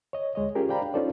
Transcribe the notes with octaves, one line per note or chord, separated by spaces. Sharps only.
C#5 D#5
D2 G#3 C#5 D#5
C#4 F4 G4 G#4 A#4
C5 D5 F5 G5 A#5 B5
D4
C#4 D#4 F4 A4 C5 D5